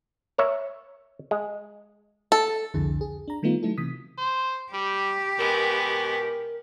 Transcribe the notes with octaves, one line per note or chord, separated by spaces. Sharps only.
A#4 C#5 E5
G#3
A4
C2 F2 D3 E4 G#4
G#4
D4 A#5
D#3 G3 A3 B3 D#4 F4
F#3 A3 D#4 E4 A4
C3 E3 D#6 B6
C5
G3 G4
B2 G#3 B3 A#4